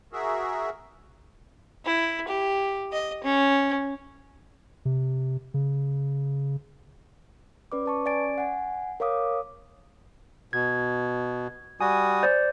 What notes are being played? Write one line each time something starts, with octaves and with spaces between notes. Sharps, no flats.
F#4 G#4 A#4 E5
E4
G4
D#5
C#4
C3
C#3
C#4 B4 D5 D6
B4 A5 C#6
C#4 D5 G#5 A6 D7
F#5 G#5
A#4 C#5 F5 D6 D#6
B2 G#6
G3 F#4 G#5 D#6
C5 D5